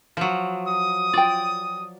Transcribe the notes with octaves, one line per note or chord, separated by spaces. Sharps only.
F3 F#3
D#6
F4 D5 G5